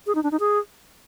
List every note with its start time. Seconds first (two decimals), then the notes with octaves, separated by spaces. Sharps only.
0.07 G#4
0.15 D#4
0.23 D4
0.32 D#4
0.40 G#4